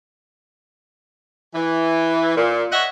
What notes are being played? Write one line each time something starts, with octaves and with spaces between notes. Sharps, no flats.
E3
A#2
C#5 D#5 E5 F#5